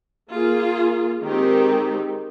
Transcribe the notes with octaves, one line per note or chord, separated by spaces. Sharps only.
A#3 F4 G#4
D#3 G#3 C4 D#4 G4